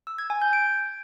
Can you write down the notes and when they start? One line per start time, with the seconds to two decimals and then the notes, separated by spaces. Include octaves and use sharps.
0.07 E6
0.18 G#6
0.30 G#5
0.42 G6
0.53 D7